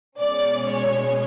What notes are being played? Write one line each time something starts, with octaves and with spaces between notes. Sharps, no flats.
B2 G#3 C#4 D5
C#5